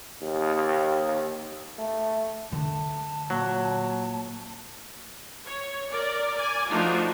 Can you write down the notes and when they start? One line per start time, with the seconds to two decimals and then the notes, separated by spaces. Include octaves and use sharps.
0.22 D#2
1.78 A3
2.52 D3 A3 A5
3.30 A#2 F#3
5.46 C#5
5.91 A#4 D5
6.36 D5 G#5
6.69 F3 A3 D4 D#4 F4 F#4